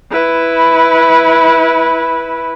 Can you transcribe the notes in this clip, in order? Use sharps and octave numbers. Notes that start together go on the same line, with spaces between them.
E4 B4